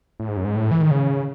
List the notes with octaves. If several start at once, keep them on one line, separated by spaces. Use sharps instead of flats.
A2
G#2
F#2
G#2
A2
E3
D#3
C#3